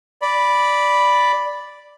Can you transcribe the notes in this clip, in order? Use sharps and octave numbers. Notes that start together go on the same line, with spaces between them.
D5 B5